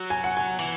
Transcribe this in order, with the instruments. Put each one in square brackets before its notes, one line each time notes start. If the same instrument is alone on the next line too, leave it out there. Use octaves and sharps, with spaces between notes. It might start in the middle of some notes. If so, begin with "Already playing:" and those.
Already playing: [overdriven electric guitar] F#3
[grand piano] G#5
F#5
G#5
[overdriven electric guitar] E3